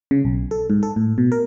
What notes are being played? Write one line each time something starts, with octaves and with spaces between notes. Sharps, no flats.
C#3
B1
A4
G#2
A4
A2
B2
A#4